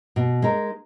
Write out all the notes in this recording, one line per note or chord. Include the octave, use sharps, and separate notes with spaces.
B2
G#3 D#4 A#4